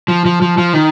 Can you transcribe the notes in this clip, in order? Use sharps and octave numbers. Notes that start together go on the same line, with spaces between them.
F3
F3
F3
F3
D#3